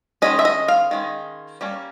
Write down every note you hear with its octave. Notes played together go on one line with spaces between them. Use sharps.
D#3 G#3 C#4 D#5
E5
D#5
F5
D#3 G#3 C#4
G3 A#3 C#4